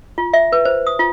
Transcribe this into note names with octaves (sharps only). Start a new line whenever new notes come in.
F4
E5
B4
C5
D#6
F4